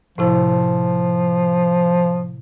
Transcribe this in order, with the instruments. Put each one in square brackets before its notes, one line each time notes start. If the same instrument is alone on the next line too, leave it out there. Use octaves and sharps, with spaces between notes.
[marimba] A2 C3 E4 [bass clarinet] F3